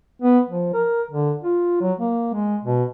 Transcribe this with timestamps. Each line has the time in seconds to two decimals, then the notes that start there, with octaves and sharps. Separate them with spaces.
0.22 B3
0.50 F3
0.73 A#4
1.11 D3
1.42 F4
1.81 F#3
2.00 A#3
2.34 G#3
2.64 B2